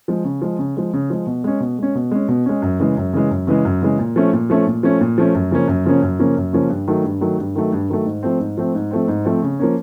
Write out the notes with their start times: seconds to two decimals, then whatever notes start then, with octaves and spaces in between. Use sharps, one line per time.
0.08 F3 G#3
0.25 C#3
0.42 F3 G#3
0.59 C#3
0.77 F3 G#3
0.93 C#3
1.10 F3 G#3
1.27 B2
1.44 G#3 C#4
1.60 B2
1.78 G#3 C#4
1.95 B2
2.11 G#3 C#4
2.28 B2
2.46 G#3 C#4
2.62 F#2
2.80 C#3 E3 G#3
2.97 F#2
3.13 C#3 E3 G#3
3.30 F#2
3.47 C#3 E3 G#3
3.65 F#2
3.82 C#3 E3 G#3
3.99 A#2
4.16 F3 A3 C#4
4.33 A#2
4.50 F3 A3 C#4
4.67 A#2
4.83 F3 A3 C#4
5.01 A#2
5.18 F3 A3 C#4
5.35 F#2
5.51 C#3 F3 A#3 C#4
5.68 F#2
5.85 C#3 F3 A#3 C#4
6.02 F#2
6.19 C#3 F3 A#3 C#4
6.37 F#2
6.53 C#3 F3 A#3 C#4
6.70 G2
6.88 D#3 F#3 A3
7.04 G2
7.21 D#3 F#3 A3
7.39 G2
7.55 D#3 F#3 A3
7.73 G2
7.90 D#3 F#3 A3
8.06 G#2
8.23 F3 A3 C4
8.40 G#2
8.57 F3 A3 C4
8.75 G#2
8.91 F3 A3 C4
9.08 G#2
9.25 F3 A3 C4
9.42 C#3
9.59 F3 A#3 C#4